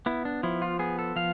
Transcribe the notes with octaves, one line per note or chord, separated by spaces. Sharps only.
B3 E4
D4
F3 E4
F4
B3 G#4
A4
F3 F5